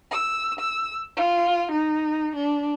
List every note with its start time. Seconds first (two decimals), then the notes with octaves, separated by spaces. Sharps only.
0.11 E6
0.59 E6
1.17 F4
1.71 D#4
2.35 D4